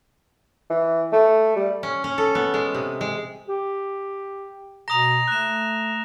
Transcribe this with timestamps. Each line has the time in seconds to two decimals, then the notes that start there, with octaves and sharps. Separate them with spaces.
0.70 E3
1.13 A3
1.56 G3
1.83 C#4
2.04 C#4
2.18 A4
2.35 B3
2.54 G#3
2.74 C3
3.01 G#3
3.48 G4
4.88 B2 A#5 D#6 A#6 F7
5.28 A3 F#6 E7